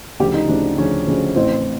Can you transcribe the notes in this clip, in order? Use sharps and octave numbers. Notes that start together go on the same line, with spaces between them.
D2 C#3 F3 G4
D#4
D2 C#3 F3 D4
D2 C#3 F3 C#4
D2 C#3 F3
A1 A2 E3 C4